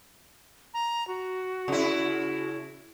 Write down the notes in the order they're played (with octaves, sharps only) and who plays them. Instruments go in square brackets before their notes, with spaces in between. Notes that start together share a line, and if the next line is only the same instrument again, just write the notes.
[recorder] A#5
F#4
[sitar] C#3 E4